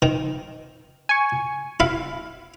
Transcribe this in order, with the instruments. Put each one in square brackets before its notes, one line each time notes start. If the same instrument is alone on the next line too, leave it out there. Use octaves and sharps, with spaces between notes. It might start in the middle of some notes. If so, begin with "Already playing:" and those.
[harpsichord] D#3
[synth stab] G#5 C#6
[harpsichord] E4 F5